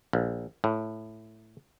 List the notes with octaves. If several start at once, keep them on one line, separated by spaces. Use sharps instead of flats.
A#1
A2